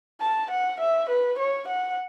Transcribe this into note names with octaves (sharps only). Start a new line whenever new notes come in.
A5
F#5
E5
B4
C#5
F#5